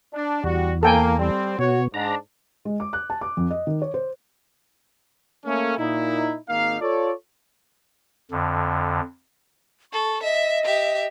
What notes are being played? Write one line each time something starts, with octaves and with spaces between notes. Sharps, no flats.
D4
E2 G3 F#4
A#3 A4 G5 G#5
G3 C4
B2 F#4 C#5
G#2 D4 A#5
G#3
D6
F#6
A5
D6
F2
D#5
D#3
C#5
C5
A3 A#3 C#4
A#2 D#4 E4
G#1 A#3 D#4 F5
F4 A4 C#5 D5
F2 D3
A4 C#6
D#5 E5
G4 E5